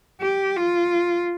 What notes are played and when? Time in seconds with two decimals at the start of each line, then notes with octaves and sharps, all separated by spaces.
0.21 G4
0.56 F4